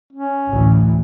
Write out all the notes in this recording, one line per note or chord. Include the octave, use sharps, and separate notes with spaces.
C#4
A1 D2 E3